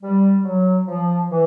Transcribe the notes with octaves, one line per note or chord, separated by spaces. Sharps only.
G3
F#3
F3
E3